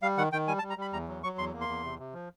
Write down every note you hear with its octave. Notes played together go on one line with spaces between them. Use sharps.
G3 F5
D#3 F#5
D#3 G5
G3 G#5
A5
G3
A#5
G3 B5
E2 A#5
F#3
F#3 C#6
E2 C6
A#3
C6
E2
C3
C3
F3